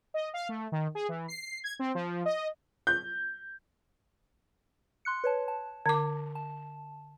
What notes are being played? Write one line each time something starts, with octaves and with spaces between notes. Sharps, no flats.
D#5
F5
A3
D#3
G#4
E3
C7
G#6
C4
F3
D#5
G6
C6 F#6 C#7
B4 C#5 A5
A5
D3 D6
A5